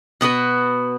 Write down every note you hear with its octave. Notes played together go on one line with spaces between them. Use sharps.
B2 B3 F#4 B4